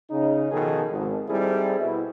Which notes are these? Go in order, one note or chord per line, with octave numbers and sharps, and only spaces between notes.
C#3 D#4
B2 D#3 F3 G#4 A4
G#1
G3 C4 D#4 E4 G#4 A4
B2 E4